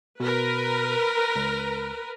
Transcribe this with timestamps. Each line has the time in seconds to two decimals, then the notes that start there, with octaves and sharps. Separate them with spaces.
0.20 B2 A#4 B4
1.36 C#2